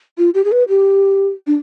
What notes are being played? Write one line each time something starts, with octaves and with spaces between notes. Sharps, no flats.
F4
G4
G#4
B4
G4
D4